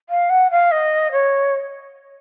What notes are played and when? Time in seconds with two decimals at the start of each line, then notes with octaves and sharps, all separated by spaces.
0.09 F5
0.30 F#5
0.51 F5
0.71 D#5
1.12 C#5